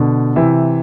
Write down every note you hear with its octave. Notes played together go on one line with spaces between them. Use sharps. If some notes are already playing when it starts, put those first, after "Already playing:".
Already playing: B2 D3
C3 E3